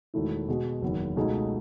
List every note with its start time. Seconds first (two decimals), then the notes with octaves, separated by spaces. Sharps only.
0.14 E1 E2 D#3 A3 E4
0.48 B2 G#3 B3 F#4
0.82 F#1 E2 D#3
1.16 C#2 B2 A3 D#4 G#4